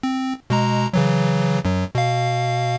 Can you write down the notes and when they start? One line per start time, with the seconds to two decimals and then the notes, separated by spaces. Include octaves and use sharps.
0.03 C4
0.50 B2 G#3 A#5
0.93 C#3 E3 F#3
1.65 F#2 F#3
1.95 B2 F5